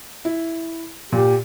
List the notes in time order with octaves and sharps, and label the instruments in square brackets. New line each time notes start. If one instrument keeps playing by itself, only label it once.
[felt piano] E4
[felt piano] A#2 [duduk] G4